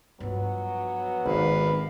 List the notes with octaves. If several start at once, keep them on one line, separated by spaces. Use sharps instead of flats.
G2 F3 F#3 B3
G#1 D#3 B4 F5